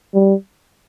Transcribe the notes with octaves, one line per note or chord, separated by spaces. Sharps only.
G3